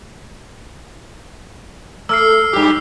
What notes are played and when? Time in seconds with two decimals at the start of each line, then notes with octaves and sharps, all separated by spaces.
2.09 A3 E6 F6 C7
2.53 G2 G4